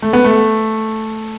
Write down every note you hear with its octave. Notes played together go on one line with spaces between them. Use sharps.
A3
B3
A3